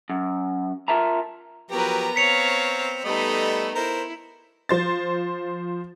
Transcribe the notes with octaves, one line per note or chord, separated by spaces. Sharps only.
F#2
F4 A#4 E5 A5 A#5
F3 F#3 B3 G4 A#4 B4 A#5
C4 C#5 F5 B6 C#7 F7
G3 A3 B3 D#4 A4 D#5 B5
E4 A#4 C5
F3 C5 A6